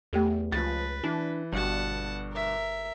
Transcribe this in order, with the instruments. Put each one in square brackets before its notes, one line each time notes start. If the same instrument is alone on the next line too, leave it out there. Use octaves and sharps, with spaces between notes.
[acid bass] E2 [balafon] A3 G4 A4
[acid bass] C#2 [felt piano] F3 A6 [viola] B4
[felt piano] E3 [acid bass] D4
[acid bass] G1 [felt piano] G2 B2 [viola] F#5 A5
[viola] A#4 E5